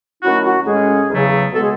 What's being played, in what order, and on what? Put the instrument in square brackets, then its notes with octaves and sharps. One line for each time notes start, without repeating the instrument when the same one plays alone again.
[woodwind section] D#3 F#3 A3 C#4 E4 F#4
F#4
A2 G#3 C#4 G#4
E2 C#3 F#3 A3
B2 G#3 B3 A4
G#4